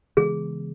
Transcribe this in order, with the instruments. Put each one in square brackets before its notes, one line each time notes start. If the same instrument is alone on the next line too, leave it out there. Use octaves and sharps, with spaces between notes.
[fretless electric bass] C#3 E3 G#3 B3 [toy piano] G#4